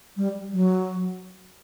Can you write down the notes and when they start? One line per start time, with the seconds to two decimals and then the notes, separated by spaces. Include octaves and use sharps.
0.17 G3
0.52 F#3